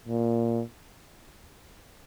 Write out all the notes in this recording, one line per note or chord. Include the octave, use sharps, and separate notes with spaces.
A#2